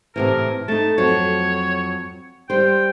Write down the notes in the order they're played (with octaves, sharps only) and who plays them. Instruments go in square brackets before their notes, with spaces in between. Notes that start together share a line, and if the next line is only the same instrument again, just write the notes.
[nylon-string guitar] A2 C3 E3 [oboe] A#4
[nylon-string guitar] A3 D#4 [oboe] A5
[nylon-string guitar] F2 F#3 [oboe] C#5
[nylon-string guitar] G3 C5 [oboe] G5